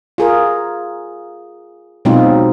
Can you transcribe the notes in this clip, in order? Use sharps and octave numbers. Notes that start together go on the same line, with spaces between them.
F4 G#4 A#4
B2 F#3 G#3 C4 D#4 F4